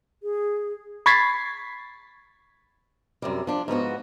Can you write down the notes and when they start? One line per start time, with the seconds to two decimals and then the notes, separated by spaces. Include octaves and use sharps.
0.23 G#4
1.06 B5 C#6 G#6 A6 B6 C7
3.22 F#2 C3 G3
3.47 F3 D4
3.68 G#2 F3 B3 F#4